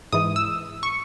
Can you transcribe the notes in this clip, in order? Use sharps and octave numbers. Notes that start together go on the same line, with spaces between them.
G#2 E3 D#6
E6
C#6